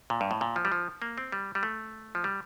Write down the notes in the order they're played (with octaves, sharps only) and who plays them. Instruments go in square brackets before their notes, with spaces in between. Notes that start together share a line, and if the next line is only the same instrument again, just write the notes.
[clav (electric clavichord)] A#2
G2
A2
A#2
F3
G3
F3
A#3
C4
G3
G3
A3
F3
G3